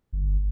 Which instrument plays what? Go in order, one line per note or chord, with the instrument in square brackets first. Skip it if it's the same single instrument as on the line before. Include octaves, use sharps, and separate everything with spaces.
[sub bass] G1